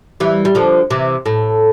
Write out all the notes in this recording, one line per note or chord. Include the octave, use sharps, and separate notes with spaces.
E3 G3
G3
D3 F3
C3 E3
A2